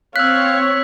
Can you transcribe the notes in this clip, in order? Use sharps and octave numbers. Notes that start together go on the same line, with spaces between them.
C4 C#5 F5 E6 F#6 B6